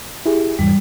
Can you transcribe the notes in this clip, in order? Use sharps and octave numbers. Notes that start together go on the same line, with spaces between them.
E4 G4 G#4
E2 G#2 E3 G3